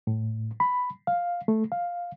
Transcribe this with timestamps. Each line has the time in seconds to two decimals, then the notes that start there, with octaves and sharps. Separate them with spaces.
0.07 A2
0.60 B5
1.07 F5
1.48 A3
1.72 F5